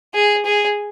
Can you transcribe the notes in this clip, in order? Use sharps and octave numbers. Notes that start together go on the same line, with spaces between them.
G#4
G#4